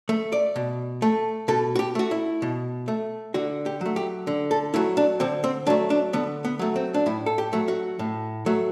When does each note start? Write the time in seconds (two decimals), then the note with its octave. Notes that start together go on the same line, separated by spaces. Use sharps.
0.09 A3
0.32 D5
0.56 B2
1.02 A3
1.48 B2 A4
1.75 F#4
1.79 G4
1.95 A3 F#4
2.11 E4
2.42 B2
2.88 A3
3.34 D3 F#4
3.66 G4
3.81 F#3 A3
3.96 G4
4.27 D3
4.51 A4
4.74 F#3 A3 E4
4.97 D4
5.20 D3 C4
5.44 C4
5.67 F#3 A3 D4
5.90 D4
6.13 D3 B3
6.45 B3
6.59 F#3 A3
6.76 C4
6.94 D4
7.06 A2 E4
7.26 A4
7.38 G4
7.53 F#3 A3
7.68 F#4
7.99 A2
8.46 F#3 A3